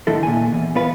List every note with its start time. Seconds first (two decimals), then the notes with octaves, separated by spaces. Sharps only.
0.07 A2 D3 D#3 E4 A4
0.23 A#2 G#5
0.52 E2
0.75 B3 F4 B4